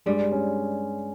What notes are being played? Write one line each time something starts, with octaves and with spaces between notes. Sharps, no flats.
G2 G3 G#3
C#4